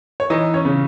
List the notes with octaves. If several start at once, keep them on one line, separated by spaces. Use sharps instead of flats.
C#5
E3 D#4 D#5
C#4 C#5
C#3